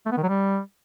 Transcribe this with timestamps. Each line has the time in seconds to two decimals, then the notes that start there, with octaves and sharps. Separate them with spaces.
0.06 A3
0.12 B3
0.17 D#3
0.23 F#3
0.29 G3